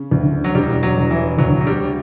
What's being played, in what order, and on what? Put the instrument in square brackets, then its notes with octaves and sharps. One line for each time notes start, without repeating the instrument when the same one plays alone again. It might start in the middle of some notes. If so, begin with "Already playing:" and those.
Already playing: [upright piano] C#3
D2
[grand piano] F#3
[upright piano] E1 [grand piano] G3
[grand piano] F#3
[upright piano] E1
[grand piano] E3
[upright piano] D2 [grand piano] F#3
[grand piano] F#3
G3